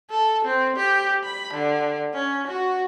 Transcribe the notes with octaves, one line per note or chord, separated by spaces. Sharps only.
A4
C4
G4
B5
D3
C#4
F#4